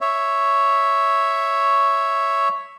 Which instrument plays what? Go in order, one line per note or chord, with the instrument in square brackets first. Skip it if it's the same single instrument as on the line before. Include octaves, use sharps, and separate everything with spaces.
[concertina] C#5 E5